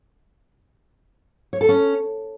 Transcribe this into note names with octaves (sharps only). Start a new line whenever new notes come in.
C#5
A4
C#4